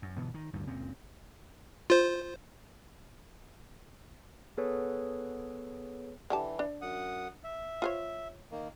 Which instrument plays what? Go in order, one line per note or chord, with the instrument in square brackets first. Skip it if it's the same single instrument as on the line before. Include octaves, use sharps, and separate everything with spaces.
[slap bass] F#2
G1 B2 E3 B3
D#3
D2 G2 A#2 D#3
C#2 F#2 A#2 C4
[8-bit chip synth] F4 C5
[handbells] B3 G#4 A4 B4 C#5
[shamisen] D3 G4 A5 [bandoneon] E3
[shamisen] D4
[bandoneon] F#2 F#5 D#6
E5
[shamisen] F4 C5 C#5
[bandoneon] D#3 A#3